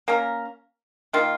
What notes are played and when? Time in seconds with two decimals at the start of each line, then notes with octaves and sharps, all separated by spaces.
0.08 A#3 C#4 A#4
1.13 D#3 A#3 F4